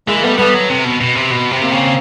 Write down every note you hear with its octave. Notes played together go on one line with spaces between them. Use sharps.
E3 G#3 A#3
G3 A3 B3
G3 A3 B3
F#3
C3
B2
B2
C3
B2
C3
A#3 C4
C#3